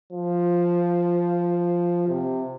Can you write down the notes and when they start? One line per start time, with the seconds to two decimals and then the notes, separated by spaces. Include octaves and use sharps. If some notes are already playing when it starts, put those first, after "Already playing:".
0.12 F3
2.08 C3